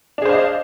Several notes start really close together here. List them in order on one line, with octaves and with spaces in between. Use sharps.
D4 G#4 C5 F5 D#5